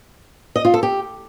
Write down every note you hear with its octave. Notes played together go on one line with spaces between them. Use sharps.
D#5
F4
A4
G4